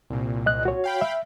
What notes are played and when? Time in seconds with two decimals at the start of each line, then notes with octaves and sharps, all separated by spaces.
0.10 C2 A#2
0.46 D#5 F#6
0.65 F#4 C#5
0.84 F5 G5 B5
1.01 E5